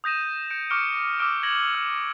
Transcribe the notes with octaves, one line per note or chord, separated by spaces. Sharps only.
D#6 G6 A#6 D#7 E7
G6 C#7 D7
C#6 D6 F6 C#7 D7
D6 E6 F6 D7
G6 G#6 A#6 E7 F#7
F6